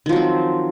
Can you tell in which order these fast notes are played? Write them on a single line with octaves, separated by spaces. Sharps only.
D#3 F3 F#3 C4